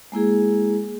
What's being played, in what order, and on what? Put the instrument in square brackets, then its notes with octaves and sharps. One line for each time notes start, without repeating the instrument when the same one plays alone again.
[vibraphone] G#3 A#3 E4 G#4